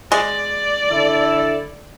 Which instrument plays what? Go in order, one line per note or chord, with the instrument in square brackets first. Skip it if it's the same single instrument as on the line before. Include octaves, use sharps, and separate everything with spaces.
[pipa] G#3 [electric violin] D5
[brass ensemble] D3 E4 A4